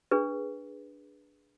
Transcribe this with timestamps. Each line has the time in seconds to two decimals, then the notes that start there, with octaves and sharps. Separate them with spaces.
0.11 D4 G#4 B4